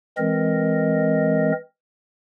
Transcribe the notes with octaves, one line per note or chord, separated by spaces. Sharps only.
E3 G#3 C4 A#4 D#5